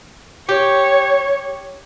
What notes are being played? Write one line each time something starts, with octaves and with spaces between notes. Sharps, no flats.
G4 C#5